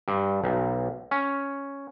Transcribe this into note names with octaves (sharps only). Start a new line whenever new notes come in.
G2
B1
C#4